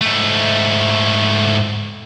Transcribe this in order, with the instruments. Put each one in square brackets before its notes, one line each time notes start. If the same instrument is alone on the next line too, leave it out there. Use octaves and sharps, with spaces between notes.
[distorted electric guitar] G#2 A3